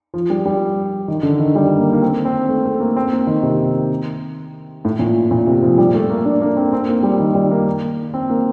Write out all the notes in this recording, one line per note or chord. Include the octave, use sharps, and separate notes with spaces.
F3
G3
G3
D#3
D3
D#3
G3
A#3
A#3
C4
C4
A3
A3
A#3
C4
A#3
D#3
C3
A2
A#2
A#2
C3
F3
G3
A3
A#3
D4
A#3
C4
C4
A#3
G3
D#3
G3
A#3
C4
A#3